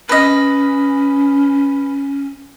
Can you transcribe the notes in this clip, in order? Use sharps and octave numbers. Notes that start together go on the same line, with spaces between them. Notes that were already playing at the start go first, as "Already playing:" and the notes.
C#4 B4 D#5